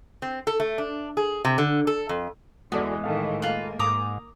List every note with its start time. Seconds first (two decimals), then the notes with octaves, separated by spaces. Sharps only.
0.22 C4
0.47 A4
0.60 A3
0.78 D4
1.17 G#4
1.45 C3
1.58 D3
1.87 A4
2.09 F2
2.72 E2 E3 G#3 B3 F#4 A4 D5
3.04 A2 D#3 E3 A4 F5
3.42 A#3 F4 B4
3.79 G#2 A#5 D6 D#6